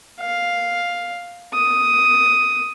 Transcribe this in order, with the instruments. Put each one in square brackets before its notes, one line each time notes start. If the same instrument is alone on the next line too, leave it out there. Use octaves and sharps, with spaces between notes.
[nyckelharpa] F5
D#6